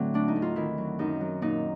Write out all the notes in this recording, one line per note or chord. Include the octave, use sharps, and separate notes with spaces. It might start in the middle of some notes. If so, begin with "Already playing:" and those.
Already playing: A2 D3 F#3 A3 C4
D2 D4
D#4
D2
F4
D#3 E4
F#3
F#2 D#4
F#3
A#2 D#4